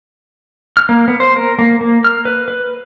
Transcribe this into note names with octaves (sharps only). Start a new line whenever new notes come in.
F6
A#3
B3
C5
A#4
A#3
A#3
F6
B4
B4